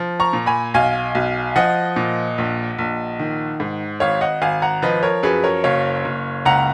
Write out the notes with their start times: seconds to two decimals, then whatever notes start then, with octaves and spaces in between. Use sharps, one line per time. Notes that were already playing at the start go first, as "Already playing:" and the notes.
Already playing: F3
0.20 A#5 C#6
0.33 A#2
0.46 G#5 B5
0.74 B1 F5 G#5
1.15 B1
1.56 F3 D#5 F#5
1.96 A#2
2.38 A#1
2.78 A#1
3.19 D#3
3.60 G#2
4.00 G#1 C#5 F5
4.21 D#5 F#5
4.42 G#1 F5 G#5
4.62 F#5 A#5
4.82 F3 B4 D#5
5.03 A#4 C#5
5.23 F#2 G#4 B4
5.44 A#4 C#5
5.64 F#1 C#5 F5
6.05 F#1
6.45 C#2 F#5 A#5